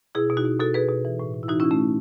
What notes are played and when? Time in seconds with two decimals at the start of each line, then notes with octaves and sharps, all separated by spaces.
0.15 B2 E4 G#4
0.30 B2
0.37 D#4 F#4
0.45 B2
0.60 B2 F#4 A4
0.74 B2 G#4 B4
0.89 B2
1.05 E3
1.20 A2
1.34 A2
1.43 E4
1.48 E3 D#4 F#4
1.60 E3 C#4 E4
1.71 A3 C#4
1.78 A2